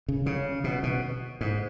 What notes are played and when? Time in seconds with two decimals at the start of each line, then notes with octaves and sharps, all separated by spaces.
0.08 C#3
0.26 C#3
0.64 B2
0.83 B2
1.41 G#2